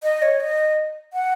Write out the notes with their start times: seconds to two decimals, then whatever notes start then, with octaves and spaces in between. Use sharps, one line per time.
0.03 D#5
0.22 C#5
0.40 D#5
1.13 F#5